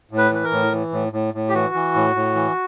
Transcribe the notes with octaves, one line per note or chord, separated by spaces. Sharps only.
A2
B4
E3 B4
A#4
A2
E3
A2
A2
A2
G4
E3 F#4
E3
A2
A2
E3